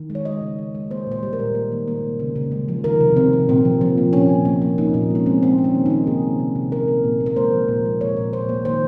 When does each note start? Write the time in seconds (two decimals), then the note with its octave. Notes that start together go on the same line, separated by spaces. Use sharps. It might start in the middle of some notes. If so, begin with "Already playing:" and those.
Already playing: D#3
0.10 G#3
0.15 C#5
0.25 G#3 D#5
0.41 C#3
0.59 G#3
0.75 G#3
0.91 A#3 C5
1.07 A#2 C5
1.23 G3
1.33 A#4
1.39 A#2
1.55 A#3
1.72 D#3
1.88 A#3
2.04 C3
2.19 C#3
2.36 C#3
2.52 G#3
2.68 F3
2.84 D#3 A#4
3.01 C3
3.16 C3 C4
3.33 C3
3.49 A#2 C4
3.65 F3
3.81 F3
3.98 A#3
4.13 A#2 C#4
4.29 A#2
4.45 A#3
4.62 A#3
4.78 F3 D#4
4.94 A#2
5.10 G#3 C#4
5.26 G#3 C4
5.42 A#3 C4
5.58 A#3
5.64 C#4
5.75 D#3
5.86 D#4
5.90 A#3
6.07 C3 G#4
6.23 D#3
6.40 C3
6.55 C3
6.72 A#3 A#4
6.88 A#3
7.04 A#2
7.20 A#3
7.26 A#4
7.36 G#3 C5
7.53 F3
7.68 A#2
7.85 G#3
8.01 A#2 C#5
8.17 A#2
8.33 A#2 C5
8.49 A#3
8.65 D#3 C5